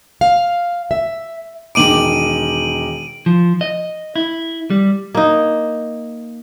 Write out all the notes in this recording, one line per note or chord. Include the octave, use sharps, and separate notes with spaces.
F5
E5
E1 D#3 D6 D7 D#7 F#7
F3
D#5
E4
G3
A#3 D#4